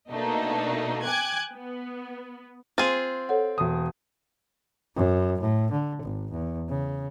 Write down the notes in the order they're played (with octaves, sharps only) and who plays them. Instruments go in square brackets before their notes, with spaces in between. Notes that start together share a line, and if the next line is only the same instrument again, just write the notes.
[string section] B2 A3 A#3 D4 D#4
G5 G#5 D6 F#6 G#6
B3
[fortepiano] C4 [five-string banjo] F4 G#4
[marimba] A4 C#5 F#5
[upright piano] E1 D#6
[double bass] F#2
A2
D3
G#1
E2
C#3